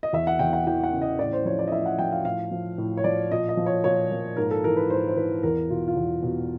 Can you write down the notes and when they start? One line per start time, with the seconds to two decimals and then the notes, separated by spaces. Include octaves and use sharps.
0.03 D#5
0.13 E2 E5
0.27 F#5
0.39 E2 G5
0.53 F#5
0.67 E3 G5
0.83 F#5
0.93 C#3
1.02 D#5
1.19 A2 D5
1.33 C5
1.45 F3 C#5
1.59 D5
1.68 D#5
1.72 A2 E5
1.86 F#5
1.99 F3 G5
2.12 F5
2.25 A2 F5
2.51 F3
2.78 A2
2.97 C#5
3.04 F3 D5
3.32 A#2 D#5
3.49 D#5
3.57 F3
3.66 C#5
3.84 A#2 C#5
4.11 F3
4.37 G#2 A#4
4.51 A4
4.64 E3 A#4
4.77 B4
4.90 G#2 C5
5.08 C5
5.17 E3 B4
5.43 E2 A#4
5.70 B2 F4
5.88 F4
5.96 E2
6.23 B2